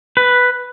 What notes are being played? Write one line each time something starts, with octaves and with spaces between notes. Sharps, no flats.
B4